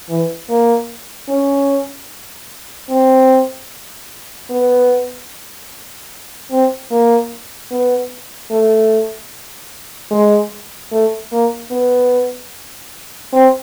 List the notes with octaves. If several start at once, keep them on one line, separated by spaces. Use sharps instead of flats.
E3
A#3
C#4
C4
B3
C4
A#3
B3
A3
G#3
A3
A#3
B3
C4